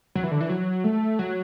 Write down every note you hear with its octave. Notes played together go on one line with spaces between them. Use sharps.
F#3
E3
D3
E3
F#3
A3
F#3